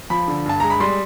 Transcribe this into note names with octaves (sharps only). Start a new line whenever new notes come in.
F3 B5
D3
G2 A5
G#3 A#5
B5
G3 C6